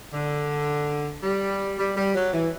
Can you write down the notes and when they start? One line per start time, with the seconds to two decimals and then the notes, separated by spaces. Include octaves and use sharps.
0.13 D3
1.23 G3
1.78 G3
1.96 G3
2.15 F#3
2.33 E3